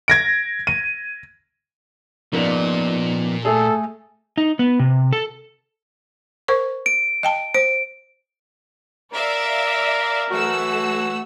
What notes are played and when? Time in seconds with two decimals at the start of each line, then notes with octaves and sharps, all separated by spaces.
0.08 G#6 A#6 D7
0.67 D#7
2.33 A#2 F3 A#3 B3 D#4 D5
3.45 A3 G#4 A4
4.38 D#4
4.59 B3
4.79 C3
5.13 A4
6.48 A#4 C5 C#6
6.86 D7
7.23 D#5 G5 A5
7.54 C5 D7
9.12 A#4 D5 E5 F5
10.31 E3 F#3 A3 F#4 F#5 E6